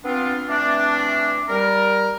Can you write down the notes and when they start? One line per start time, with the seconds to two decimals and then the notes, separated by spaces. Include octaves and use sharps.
0.04 B3 C4 D4 F4
0.48 E3 A3 C4 D4
1.48 G3 A#4